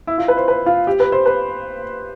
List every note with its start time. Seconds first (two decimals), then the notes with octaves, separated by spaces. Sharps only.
0.07 E4
0.18 F4
0.28 B4
0.37 C5
0.48 B4
0.66 F4
0.87 G4
1.00 B4
1.12 C5
1.26 B4